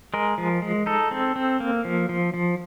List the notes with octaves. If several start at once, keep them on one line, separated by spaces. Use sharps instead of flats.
G#3 A#4
F3
G#3
D#4 A4
C4
C4
A#3
F3
F3
F3